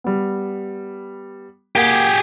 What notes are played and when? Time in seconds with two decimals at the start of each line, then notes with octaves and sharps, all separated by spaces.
0.04 G3 B3
1.76 A#3 G4 G#4 F#5 G5